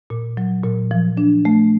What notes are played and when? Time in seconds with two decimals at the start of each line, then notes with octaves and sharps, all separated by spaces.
0.10 A#2
0.37 F#3
0.64 A#2
0.91 F3
1.17 D4
1.45 A3